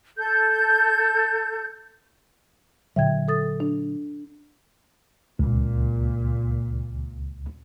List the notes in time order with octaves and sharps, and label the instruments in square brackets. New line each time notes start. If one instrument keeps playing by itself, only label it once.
[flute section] A4 G6
[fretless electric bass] A#2 D3 F#3 [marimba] E5 G5 G#6
[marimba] A4 D#6 A6
D4
[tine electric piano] C#2 [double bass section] A#2